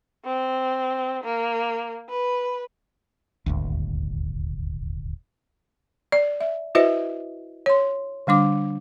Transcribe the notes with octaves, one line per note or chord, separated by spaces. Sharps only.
C4
A#3
B4
D#1 G#1 D2
D5
E5
E4 F#4 B4 C5 D#5 E5
C#5 C6
D3 G3 D4 D6